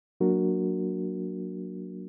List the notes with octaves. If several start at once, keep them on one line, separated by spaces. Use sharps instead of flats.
F#3 A#3 D4 F#4 A#4